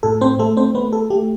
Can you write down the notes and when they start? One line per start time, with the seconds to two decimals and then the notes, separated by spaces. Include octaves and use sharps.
0.03 A2 A4
0.21 C4 C5
0.39 A3 A4
0.57 C4 C5
0.75 A3 B3 B4
0.93 A4
1.10 A3 G4